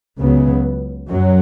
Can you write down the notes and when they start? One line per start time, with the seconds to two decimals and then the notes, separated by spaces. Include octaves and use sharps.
0.19 C#2 C#3 F#3 B3
1.10 F#2 F#3